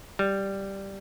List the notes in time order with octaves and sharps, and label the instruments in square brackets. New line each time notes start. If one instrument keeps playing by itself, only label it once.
[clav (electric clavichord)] G3